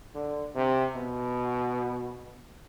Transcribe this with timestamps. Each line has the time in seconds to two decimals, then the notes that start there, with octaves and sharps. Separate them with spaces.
0.15 D3
0.55 C3
0.96 B2